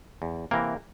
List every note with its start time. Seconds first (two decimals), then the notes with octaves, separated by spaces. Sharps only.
0.22 E2
0.51 C3 E3 A#3 A#4